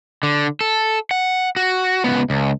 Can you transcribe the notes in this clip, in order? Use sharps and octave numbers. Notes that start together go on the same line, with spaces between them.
D3
A4
F#5
F#4
C#2 B3
C#2